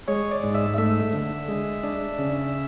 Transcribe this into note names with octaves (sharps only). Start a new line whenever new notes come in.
G#3 C#5
D5
G#2
E5
A3 E5
D3
G#3
D4
C#3